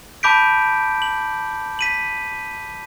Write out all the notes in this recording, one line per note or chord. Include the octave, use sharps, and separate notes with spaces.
A5 B5 D6 G6 B6 D7
F#7
B6 D#7 F#7